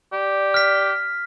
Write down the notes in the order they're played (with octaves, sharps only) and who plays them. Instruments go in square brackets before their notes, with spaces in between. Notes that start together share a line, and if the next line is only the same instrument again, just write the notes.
[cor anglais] G4 [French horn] D5
[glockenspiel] F6 B6